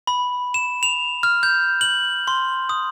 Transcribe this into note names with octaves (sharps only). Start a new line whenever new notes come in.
B5
E7
F7
F6
G6
F#7
C6
D#6